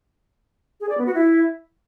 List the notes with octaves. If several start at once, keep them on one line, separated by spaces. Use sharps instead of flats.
G#4
D5
B3
F#4
E4